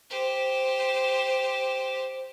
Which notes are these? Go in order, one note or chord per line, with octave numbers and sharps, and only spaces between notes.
G4 C5